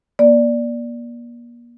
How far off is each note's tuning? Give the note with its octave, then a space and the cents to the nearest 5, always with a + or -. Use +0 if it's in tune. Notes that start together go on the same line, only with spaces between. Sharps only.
A#3 +35 D5 +0